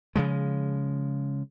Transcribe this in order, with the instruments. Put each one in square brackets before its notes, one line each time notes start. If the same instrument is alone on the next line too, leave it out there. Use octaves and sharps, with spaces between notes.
[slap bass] C#3 F3 G#3